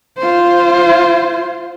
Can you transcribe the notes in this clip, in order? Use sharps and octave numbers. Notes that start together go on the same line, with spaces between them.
F4 C5